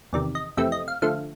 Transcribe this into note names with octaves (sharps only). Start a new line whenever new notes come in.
E2 C3 D#3 D5
D#5
F2 C3 E3 A3 C4 E5
D#5
F5
D3 F3 A3 F5